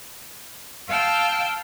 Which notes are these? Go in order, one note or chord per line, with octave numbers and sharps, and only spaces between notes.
F5 G5 A5 E6 F6